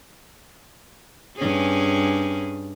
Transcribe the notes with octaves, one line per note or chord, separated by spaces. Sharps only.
G2 C#4 G#4